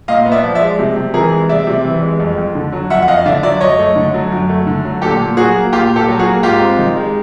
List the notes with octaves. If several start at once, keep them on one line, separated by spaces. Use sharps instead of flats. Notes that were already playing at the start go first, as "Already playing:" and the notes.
A#2 D#5 F5
B3
D5 E5
F3
D5 E5
G#3
C3
C3
E3 G#4 A#4
G#3
C3 D5 E5
C3
E3
G#3
F2
F2
D3
F#3
F2 E5 F#5
F#5
F2 D#5 F5
F5
D3 D5 E5
F#3 D5 E5
F#2 C#5 D#5
A3
D3
F#3
F#2
A3
D3
F#3
A#2 G4 A4
A#2
F#3 F#4 G#4
A#3
A#2 F4 G4
A#2
G4 A4
F#3
F#4 G#4
A#3
G#2 F4 G4
C4
D#3
G#3